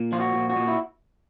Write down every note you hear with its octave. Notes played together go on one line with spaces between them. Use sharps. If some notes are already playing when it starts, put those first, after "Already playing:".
Already playing: A#2
F3 F4
F#4
A#2
F#4
A#2
E4